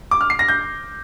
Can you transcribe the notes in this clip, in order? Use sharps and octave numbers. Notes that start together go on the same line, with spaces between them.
D6
F6
C7
A#6
G6